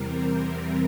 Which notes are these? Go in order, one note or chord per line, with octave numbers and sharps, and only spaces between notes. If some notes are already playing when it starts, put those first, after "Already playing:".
Already playing: E2 C3 E3 G3 C4 A#4